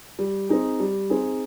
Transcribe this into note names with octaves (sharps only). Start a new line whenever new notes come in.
G3
C4 D#4 G#4
G3
C4 D#4 G#4